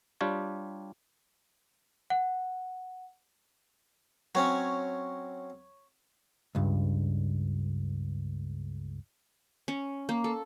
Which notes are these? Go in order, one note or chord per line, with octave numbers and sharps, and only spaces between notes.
G3 D4 F4 G4 C#5
F#5
F#3 C4 C#4 C#5
C#2 G2
C#4
A#3
A4